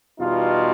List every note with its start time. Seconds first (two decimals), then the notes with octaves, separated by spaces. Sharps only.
0.19 E2 B2 G3 D#4 F4